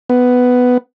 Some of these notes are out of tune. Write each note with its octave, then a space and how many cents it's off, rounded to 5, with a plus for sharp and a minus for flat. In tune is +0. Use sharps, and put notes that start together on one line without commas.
B3 +5